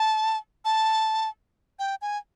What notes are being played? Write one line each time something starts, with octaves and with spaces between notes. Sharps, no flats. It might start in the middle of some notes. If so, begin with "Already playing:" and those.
Already playing: A5
A5
G5
G#5